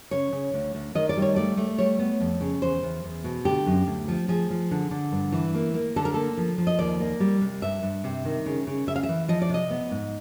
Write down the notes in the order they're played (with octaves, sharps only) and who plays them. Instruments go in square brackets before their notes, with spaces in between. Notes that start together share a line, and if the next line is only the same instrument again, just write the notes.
[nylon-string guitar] C#3 C#5
C#3
D2
D2
D#3 D#5
D5
G3
C#5
A3 D5
A3
G3 C#5
B3
F2
C#3
E2 C5
E2
E2
B2
D3 G4
F#2
D2
F3
F3 G#4
F3
D3
D3
G2
E3
A#3
A#3
D3 A4
A#4
A#3 A4
F3
F3
D#5
D#2 D5
A#3
G3
C3
G2 E5
G2
C3
D#3
C#3
C#3
C#3 E5
F5
E5
E3
F3 D#5
D5
C3 D#5
B3
G#2